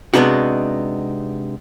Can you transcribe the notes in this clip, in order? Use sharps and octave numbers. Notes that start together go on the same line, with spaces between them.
C3 G#3 B3 D4 D#4 F#4